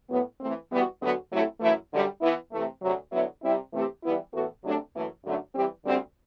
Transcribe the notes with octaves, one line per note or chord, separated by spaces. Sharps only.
A2 F#3 B3
E3 A3 C4
E3 G3 B3 F#4
D2 D3 F#3 B3 F#4
C3 F#3 A3 E4 A4
F#2 E3 A3 E4
F#2 D3 G3
E3 B3 E4
C3 E3 A3
D2 C3 F#3
D3 F#3 B3 E4
C3 G3 C4 E4
C3 E3 A3 C4 G4
E3 G3 B3 E4
A2 E3 B3 F#4 A4
C3 F#3 A3 D4 A4
F#2 E3 A3
F#2 D3 F#3 A3 D4
E3 G3 C4 G4
D2 D3 G3 C4